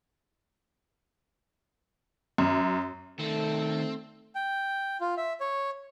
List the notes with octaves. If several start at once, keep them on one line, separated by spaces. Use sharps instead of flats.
F#2
D#3 A3 C4 A4
G5
F4
E5
C#5